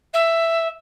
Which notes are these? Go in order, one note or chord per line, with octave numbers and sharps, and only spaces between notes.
E5